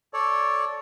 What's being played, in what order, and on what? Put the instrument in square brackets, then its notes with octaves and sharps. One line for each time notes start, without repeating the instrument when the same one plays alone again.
[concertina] A4 C#5 D5